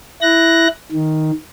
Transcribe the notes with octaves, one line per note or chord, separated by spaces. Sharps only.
E4 F#6 A#6
D#3